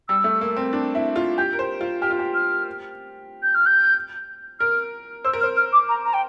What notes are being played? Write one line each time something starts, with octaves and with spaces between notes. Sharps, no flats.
G3 E6
A3
A#3
C4
D4
E4
F4
G4 G6
A#4
C5
F4
G4 F6
F4
G4
F6
G6
F6
G6
A#4 F6
C5 E6
A#4
C5 F6
F6
D6
A#5
A#5
G5